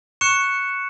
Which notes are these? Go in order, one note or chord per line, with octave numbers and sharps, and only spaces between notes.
C#6 F#6 C#7 E7